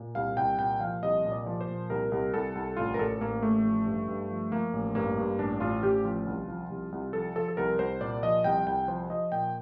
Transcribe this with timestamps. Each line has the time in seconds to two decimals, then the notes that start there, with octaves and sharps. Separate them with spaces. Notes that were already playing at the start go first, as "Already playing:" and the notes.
Already playing: A#2
0.15 C2 F5
0.37 C2 G5
0.59 A#2 G5
0.80 F3 F5
1.03 C2 D#5
1.25 A#2
1.32 D5
1.46 F3
1.61 C5
1.68 A#2
1.90 C2 A#4
2.12 C2
2.34 C2 A4
2.55 C2
2.77 A1 F4
2.94 A#4
2.99 A1 A4
3.21 A1 A#3
3.42 A1 A3
3.65 F3
3.86 G2
4.08 G2
4.30 F3
4.52 F3 A#3
4.73 A1
4.95 G2 A#3
5.17 G2
5.39 A1 D4
5.60 A1 F4
5.83 A1 G4
6.05 F3 F4
6.27 C2
6.48 F3
6.70 C2
6.92 C2
7.13 F3 A4
7.36 F3 A4
7.48 A4
7.57 C2 A#4
7.79 C2 C5
8.01 A#2 D5
8.23 F3 D#5
8.44 C2 G5
8.66 C2 G5
8.88 F3 C5
9.10 F3 D#5
9.32 A#2 G5